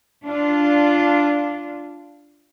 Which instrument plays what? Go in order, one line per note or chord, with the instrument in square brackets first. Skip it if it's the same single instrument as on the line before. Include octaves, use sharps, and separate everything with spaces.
[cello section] D4 F4